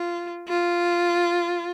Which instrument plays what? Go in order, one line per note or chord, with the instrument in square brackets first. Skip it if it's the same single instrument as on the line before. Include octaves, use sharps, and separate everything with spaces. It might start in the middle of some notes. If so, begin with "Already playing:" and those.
Already playing: [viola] F4
F4